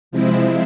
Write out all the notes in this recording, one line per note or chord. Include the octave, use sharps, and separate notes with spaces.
C3 F3 G#3 C4 E4